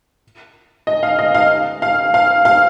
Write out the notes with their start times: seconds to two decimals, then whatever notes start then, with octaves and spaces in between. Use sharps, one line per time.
0.87 D#5
1.03 F5
1.19 D#5
1.35 F5
1.82 F5
2.14 F5
2.45 F5